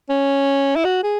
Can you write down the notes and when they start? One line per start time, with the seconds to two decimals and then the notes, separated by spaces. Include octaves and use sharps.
0.09 C#4
0.76 E4
0.85 F#4
1.03 G#4